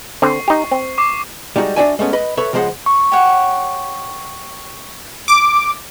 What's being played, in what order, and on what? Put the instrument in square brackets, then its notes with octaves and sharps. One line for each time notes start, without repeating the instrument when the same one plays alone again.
[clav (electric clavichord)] D3 C4 [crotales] C#6 C7
[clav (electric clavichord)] D#4 G4
C4
[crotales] C#6 D6 C7
[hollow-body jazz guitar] G3 G#3 D#4 F#4
D4 F4 F#4 D5 E5 G#5
G#3 A3 B3 C#4
B4 D#5 B5
A4 B4 C#5 E5
C#3 F3 G#3 G#4 C5 F#5
[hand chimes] C#6
[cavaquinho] G4 C#5 F#5
[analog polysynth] D6